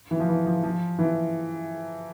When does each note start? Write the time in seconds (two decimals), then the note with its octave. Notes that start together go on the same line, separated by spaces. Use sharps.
0.11 E3
0.20 F3
0.29 E3
0.46 F3
0.63 F3
0.99 E3